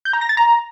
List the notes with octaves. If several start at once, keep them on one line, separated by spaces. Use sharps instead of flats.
G6
A#5
A#6
A6
A#5